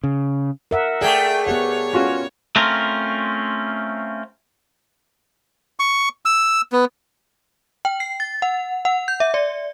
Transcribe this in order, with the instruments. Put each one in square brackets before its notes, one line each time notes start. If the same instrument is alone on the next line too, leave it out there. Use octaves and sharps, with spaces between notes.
[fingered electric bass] C#3
[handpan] A#4 E5 F#5
[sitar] A3 G#4 [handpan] D5 [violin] G5
[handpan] B3 G4 F#5 [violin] C#5
[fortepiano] C#4 F4 F#4
[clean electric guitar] A3 C4 C#4 F4 A#4
[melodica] C#6
E6
B3
[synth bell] G5
C7
A6
F#5
F#5
G6
E5
D5